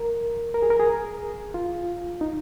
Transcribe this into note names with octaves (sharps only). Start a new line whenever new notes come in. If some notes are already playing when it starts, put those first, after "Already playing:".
Already playing: A#4
A#4
G#4
A#4
G#4
F4
D#4